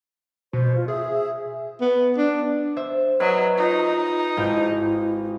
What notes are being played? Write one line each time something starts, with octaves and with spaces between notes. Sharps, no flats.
B2 C5
F4
G#4 E5
E5
B3
D4
C5 E5
F#3 B4 D#5 E5
D#4 F4
G#1 E4 F5 G5